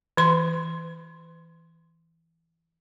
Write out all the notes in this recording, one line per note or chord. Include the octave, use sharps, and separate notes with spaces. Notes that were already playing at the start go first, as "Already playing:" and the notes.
E3 C6